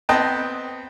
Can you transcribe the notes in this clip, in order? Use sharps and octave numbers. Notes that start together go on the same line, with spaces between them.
B3 C4 D#5 G5 A5